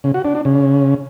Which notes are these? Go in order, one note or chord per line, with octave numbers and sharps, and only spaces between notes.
C#3
F#4
D4
D4
C#3